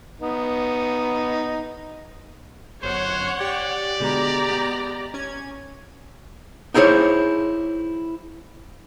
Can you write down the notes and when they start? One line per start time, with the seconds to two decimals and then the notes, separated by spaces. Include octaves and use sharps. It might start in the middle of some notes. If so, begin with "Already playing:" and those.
0.20 B3 D#4
2.83 G1 F#2 C5 C#5 F#5
3.40 G4 D5 G5
4.00 B2 D3 G#3 G4 A#5
4.48 G#3 B3
5.14 C#4 G#6
6.74 D#4 E4 G#4 C5 C#5